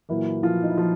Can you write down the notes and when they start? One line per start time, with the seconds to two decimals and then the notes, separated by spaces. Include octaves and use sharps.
0.09 A#2 E3 F#3 A#3 E4
0.43 F3 F4
0.63 D#4
0.70 E4
0.77 F3 F4